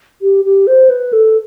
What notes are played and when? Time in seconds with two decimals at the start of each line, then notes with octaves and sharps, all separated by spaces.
0.22 G4
0.45 G4
0.67 C5
0.90 B4
1.13 A4